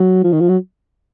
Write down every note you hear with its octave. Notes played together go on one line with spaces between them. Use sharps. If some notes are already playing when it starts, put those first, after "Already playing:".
Already playing: F#3
F3
D#3
F3
F#3